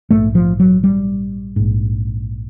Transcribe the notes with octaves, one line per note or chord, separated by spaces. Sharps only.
A#1 G#2 A3
F3
F#3
G3
A#1 G#2